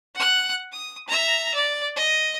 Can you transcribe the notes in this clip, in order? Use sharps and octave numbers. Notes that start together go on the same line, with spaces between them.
F#5 F#6
D#6
E5 A#5
D5
D#5